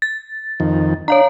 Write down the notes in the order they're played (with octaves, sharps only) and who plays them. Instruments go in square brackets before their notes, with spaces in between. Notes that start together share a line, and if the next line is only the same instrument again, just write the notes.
[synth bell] A6
[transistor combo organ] F2 D#3
[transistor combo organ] D4 [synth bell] C#5 F5 A#5